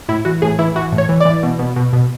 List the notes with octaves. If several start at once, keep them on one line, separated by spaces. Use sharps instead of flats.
A2 E4
E3 F#4
A2 G#4
E3 E4
E3 F#4
A2
C#5
E3
E3 D5
B2
B2
B2
B2